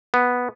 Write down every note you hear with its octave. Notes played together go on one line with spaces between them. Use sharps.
B3